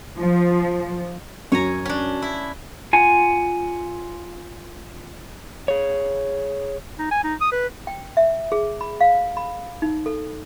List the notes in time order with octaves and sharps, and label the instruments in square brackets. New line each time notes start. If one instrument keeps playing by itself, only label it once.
[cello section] F3
[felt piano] F#2 [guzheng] C#5 G#5 A#5
[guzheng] C#4 D4
E4
[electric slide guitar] F4 F#5 G#5
G#4 C#5
[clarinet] D#4
G#5
D#4
D#6
B4
[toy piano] G5
E5
G#4
B5
F5
B5
D#4
A4